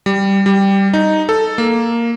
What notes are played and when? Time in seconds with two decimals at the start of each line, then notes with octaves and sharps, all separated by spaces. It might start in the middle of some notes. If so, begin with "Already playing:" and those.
0.06 G3
0.46 G3
0.93 D#4
1.29 A4
1.58 A#3